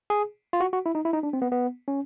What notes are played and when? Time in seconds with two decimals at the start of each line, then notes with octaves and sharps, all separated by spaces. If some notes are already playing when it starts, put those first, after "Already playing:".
0.10 G#4
0.53 F4
0.61 F#4
0.73 F#4
0.86 E4
0.95 D#4
1.05 E4
1.13 D#4
1.23 D4
1.33 C4
1.42 B3
1.52 B3
1.88 C#4